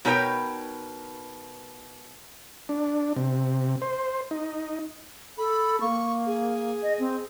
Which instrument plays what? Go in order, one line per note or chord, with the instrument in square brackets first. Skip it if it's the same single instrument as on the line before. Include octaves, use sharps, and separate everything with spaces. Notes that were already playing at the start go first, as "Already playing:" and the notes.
[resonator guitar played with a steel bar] B2 D#4 A#4 B4 C#5 G5
[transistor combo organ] D4
C3
C5
D#4
[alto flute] A4 [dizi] B5
[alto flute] A#3 [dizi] C#6
[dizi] G#4
[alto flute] D#5
C4